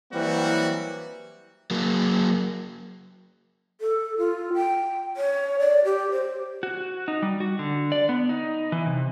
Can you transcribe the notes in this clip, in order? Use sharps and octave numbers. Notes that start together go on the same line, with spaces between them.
E3 F#3 G3 A#3 C4 F#4
F#3 A#3
A4
F4
G5
C#5
D5
G4
C5
F#4
D#4
G3
F#4
D3
D5
B3
D#4
E3
C3